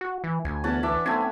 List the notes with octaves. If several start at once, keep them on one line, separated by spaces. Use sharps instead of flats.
F#4
E3
D2 G#5
E2 C#4 F#5 A5
E3 D4 E5 D6
B1 A3 C4 G#5